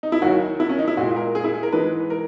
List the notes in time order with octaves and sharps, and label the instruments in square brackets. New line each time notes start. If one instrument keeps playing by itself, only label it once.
[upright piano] D#4
E4
D#2 D#3 F#3 F#4
E4
C#4
D#4
E4
A#2 F#4
G#3
A#4
G#4
E4
G#4
A#4
G#2 E3 G#3 B4
A#4